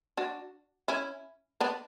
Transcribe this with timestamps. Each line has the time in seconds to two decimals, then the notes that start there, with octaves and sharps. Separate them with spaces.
0.17 D4 F#4
0.88 C#4 E4
1.60 B3 D4